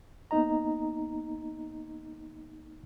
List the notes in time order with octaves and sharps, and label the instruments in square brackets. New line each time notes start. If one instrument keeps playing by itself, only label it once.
[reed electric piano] A#3 B3 D#4 D#5 A#5